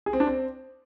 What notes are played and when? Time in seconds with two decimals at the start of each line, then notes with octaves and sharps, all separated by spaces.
0.06 G#4
0.13 C4
0.20 D4
0.27 C4